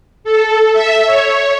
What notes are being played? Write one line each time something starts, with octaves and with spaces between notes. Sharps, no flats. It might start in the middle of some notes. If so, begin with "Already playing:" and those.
A4
E5
C#5